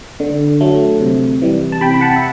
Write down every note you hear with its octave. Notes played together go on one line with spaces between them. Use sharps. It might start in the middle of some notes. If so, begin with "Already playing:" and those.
D3
F#3 A3
C3
E3 G3
A5
C3 G5 B5
B5
F#5 A5
E5